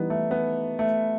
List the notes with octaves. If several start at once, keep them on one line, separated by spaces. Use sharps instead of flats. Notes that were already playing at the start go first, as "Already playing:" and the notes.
Already playing: E3 G3 B3 D#4
A3
B3
A3